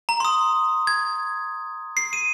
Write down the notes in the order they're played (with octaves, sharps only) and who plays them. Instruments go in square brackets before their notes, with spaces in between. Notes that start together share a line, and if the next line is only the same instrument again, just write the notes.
[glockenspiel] A#5
C6
D#6
G#6
C7
D#7